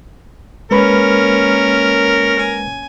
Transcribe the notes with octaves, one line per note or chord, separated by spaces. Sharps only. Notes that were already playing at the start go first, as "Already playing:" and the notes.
G#3 A#3 C#4 A#4 B4 B5
G#5